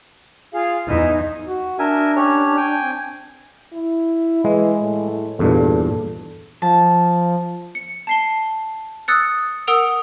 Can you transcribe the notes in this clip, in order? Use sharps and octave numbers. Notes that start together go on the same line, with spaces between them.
F4 G#4 F5
E2 D#4 E4 G#5
F#4
D4 A#4 E5 G#5
C#4 G4 C#5
G5 G#5
C4
E4
E3 G#3
A2
E2 G2 A#2 A4
F3 A5
C#7
A5 C7 G7
D#6 E6 F#6 A6 C#7
A#4 F#5 D#6 E6 D7 F7